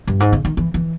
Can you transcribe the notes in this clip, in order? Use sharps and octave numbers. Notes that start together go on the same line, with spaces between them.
G2
G#2
C#3
D#3
E3
E3